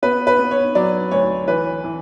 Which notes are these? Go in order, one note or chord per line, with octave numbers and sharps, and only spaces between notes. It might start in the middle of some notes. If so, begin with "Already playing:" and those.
B3 B4
B4
B3
C#5
F#3 D5
D2 C#5
E3 B4
E3